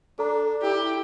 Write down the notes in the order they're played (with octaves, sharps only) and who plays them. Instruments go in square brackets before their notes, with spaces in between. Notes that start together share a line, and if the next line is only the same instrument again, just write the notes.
[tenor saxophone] D4 [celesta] A4 A#5
[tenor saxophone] E4 [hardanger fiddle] G4